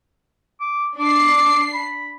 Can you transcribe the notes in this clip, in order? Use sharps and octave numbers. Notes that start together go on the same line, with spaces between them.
D6
D4 D6 C7
B5